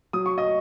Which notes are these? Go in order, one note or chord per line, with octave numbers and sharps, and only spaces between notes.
F#3 D#6
C#6
D#5 D#6